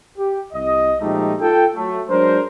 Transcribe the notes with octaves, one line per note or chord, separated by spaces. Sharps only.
G4
C2 D#5
A#2 F3 G#3 A3 D#4 G4
F4 A4 G5
F#3 A3
F#3 G#3 D4 A#4 C5